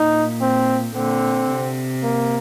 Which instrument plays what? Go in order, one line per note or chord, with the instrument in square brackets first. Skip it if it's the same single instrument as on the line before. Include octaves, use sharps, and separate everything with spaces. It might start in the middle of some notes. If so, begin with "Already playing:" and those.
Already playing: [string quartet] A#2 [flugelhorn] D#4
[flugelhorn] C4
[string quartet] A#2 D3 [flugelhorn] C4
[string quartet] C3
[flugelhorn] A#3